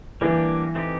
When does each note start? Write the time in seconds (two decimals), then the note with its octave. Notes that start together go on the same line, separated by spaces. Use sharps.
0.21 E3 G3 A#3 D4 G4
0.75 A3 C4 D#4 G4